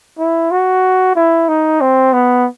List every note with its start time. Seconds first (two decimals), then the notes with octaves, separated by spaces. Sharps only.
0.19 E4
0.51 F#4
1.16 E4
1.48 D#4
1.81 C4
2.13 B3